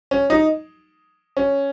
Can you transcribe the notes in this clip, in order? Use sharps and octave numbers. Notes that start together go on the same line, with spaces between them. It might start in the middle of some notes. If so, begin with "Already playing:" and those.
C#4
D#4
C#4